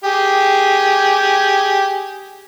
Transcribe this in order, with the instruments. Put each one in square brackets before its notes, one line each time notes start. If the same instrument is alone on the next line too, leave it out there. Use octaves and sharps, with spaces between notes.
[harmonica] G4 G#4